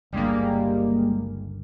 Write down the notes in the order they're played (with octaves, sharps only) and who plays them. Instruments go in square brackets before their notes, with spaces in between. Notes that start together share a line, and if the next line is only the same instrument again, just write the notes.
[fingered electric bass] G1 C#2 D3 [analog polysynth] G3 G#3 A#3